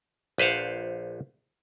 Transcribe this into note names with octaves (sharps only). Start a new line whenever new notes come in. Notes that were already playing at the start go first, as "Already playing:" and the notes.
A#1 B4 C5 F5 F#5